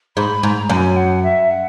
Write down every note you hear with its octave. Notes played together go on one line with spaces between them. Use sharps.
G#2 B5
G#2 A#5
F#2 G#5
F#5
E5
F#5